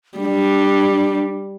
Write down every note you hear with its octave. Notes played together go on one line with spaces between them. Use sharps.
G3 D4